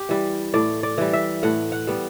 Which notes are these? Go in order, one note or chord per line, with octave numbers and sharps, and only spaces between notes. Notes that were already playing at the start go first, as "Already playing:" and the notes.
Already playing: G4
E3 G3
A2 D5
D5
E3 G3
E5
A2 F#5
F#5
G3 B3